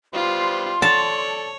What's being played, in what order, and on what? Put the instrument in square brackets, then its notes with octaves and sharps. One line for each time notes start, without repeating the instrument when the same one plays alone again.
[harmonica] G3 B3 C5 [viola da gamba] F4 [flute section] C6
[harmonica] A4 D5 [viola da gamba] C#5 [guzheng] A5